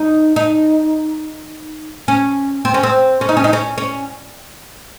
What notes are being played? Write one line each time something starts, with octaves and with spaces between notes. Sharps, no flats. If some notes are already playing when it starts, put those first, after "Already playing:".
Already playing: D#4
D#4
C#4
C4
C#4
C4
C#4
D#4
C#4
D#4
C#4
C#4